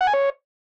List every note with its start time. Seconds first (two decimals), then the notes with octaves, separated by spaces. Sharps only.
0.01 F#5
0.07 G#5
0.13 C#5